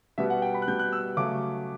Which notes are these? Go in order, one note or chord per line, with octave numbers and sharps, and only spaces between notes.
B2 G3 B3 E5
F#5
G5
B5
F#6
B2 G3 B3 G6
F#6
E6
C#3 F#3 A3 C#4 D6